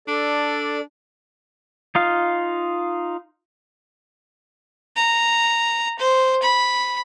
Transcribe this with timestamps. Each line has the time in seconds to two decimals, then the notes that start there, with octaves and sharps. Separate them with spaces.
0.08 D4 A4 D5
1.95 D#4 F4 F5
4.97 A#5
5.99 C5
6.42 B5